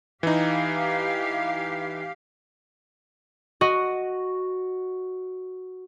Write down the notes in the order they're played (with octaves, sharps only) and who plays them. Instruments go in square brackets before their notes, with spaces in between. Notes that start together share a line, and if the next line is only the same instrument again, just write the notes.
[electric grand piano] E3 D#4 [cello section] G4 F5
[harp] F#4 D#5